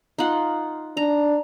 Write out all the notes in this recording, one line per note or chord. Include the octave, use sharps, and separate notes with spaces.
D#4 F4 F#5
D4 A#5